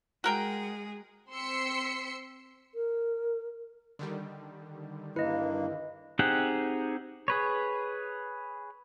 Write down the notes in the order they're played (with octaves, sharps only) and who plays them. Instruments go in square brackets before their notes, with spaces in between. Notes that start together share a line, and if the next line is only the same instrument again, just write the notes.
[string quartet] G#3 G#4 [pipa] F#4 A#4 G5
[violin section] C4 C6 E6 B6 C#7
[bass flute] A#4
[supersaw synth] D3 D#3 G3
[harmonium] G2 A#3 [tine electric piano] E4 [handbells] B4 D#5
[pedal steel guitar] C4 D#4 G4 G#4 F#5
G#4 B4 C#5